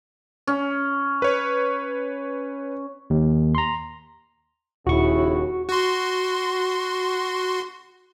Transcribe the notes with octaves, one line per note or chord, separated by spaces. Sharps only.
C#4
B4 C#5
D#2
A#5 C6
D#1 D#2 C#3 E4 F#4 C#6
F#4 C6